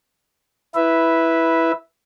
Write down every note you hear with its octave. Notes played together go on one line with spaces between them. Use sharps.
E4 B4 E5